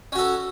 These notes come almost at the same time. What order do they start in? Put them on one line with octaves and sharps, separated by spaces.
C#4 F#4 A4